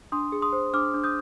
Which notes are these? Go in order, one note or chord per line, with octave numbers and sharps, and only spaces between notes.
D4 C6 D#6
G#4
C6 D#6
C5
D4 D6 F6
D4
D#6 G6